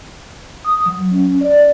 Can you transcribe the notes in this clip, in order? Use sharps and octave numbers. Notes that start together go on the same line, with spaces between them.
D#6
F#3
C#4
D5